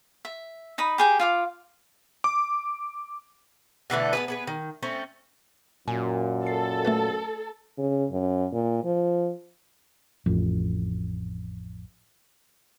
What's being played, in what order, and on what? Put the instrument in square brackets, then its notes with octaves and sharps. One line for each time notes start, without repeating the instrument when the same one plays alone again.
[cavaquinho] E5
D#4 B5 D#6
G4 G#4 G5
F4 F5 D6
[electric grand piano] D6
[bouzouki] B2 D3 E3 A3
B3 G#4 B4
B3 G#4 B4
D#3
A3 C4 C#4
[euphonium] F#2 [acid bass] A#2 [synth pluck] G#5
[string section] A4 [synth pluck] C7
[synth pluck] A3 F#4 B4
[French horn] C#3
F#2
A#2
F3
[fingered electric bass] A1 F2